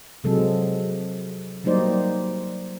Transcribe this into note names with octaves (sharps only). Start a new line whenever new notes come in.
C3 F3 F#3 G#3 A4
F#3 G3 A#3 D#4 C5 D5